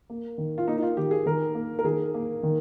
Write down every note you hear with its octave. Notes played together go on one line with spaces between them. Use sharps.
A#3
D#3
F4
A#3 D#4
D#4
F4
D#3 G4
G#4
D#3 A#4
A#3
A#4
D#3 G#4
A#3
D#3